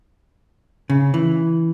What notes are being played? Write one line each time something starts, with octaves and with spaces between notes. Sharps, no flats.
C#3
E3